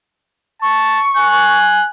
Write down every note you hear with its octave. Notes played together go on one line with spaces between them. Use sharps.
A5 C#6
G#5 F#6